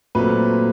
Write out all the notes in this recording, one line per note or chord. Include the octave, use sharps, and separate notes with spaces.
A#2 F#3 A3 C4 B4